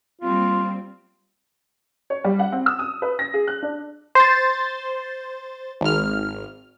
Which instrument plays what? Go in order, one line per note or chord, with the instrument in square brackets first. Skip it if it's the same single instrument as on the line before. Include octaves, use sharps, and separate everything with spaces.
[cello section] G3 A#3 C4 [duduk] F4
[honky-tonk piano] C#5
G3
F#5
C4
E6
D#6
B4
A#6
G#4
F#6
D4
[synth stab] C5 A6
G#1 F6